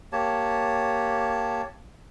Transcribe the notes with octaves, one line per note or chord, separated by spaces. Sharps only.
A#3 G4 C#5 A5